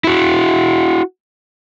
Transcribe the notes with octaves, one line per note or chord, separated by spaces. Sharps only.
E4 F#4